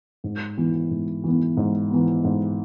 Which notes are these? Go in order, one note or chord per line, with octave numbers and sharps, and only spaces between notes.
G#2
E3 B3
G#2
E3 B3
G#2
E3 B3
G#2